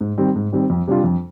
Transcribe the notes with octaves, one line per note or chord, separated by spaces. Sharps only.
G#2
D#3 G3 C4
G#2
D#3 G3 C4
F2
C3 G3 D4 F4
F2